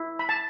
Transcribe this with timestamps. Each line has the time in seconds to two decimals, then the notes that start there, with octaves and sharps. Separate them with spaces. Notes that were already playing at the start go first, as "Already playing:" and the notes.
Already playing: E4
0.19 B5
0.29 A5